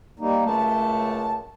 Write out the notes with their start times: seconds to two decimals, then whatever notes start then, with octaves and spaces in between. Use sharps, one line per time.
0.19 G3 A#3 D#4
0.46 C#2 F#2 A3 A5